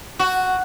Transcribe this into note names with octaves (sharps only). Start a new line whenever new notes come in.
F#4